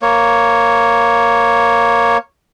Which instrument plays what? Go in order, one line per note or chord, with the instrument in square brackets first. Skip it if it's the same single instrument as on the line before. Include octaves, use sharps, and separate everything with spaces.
[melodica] A#3 C#5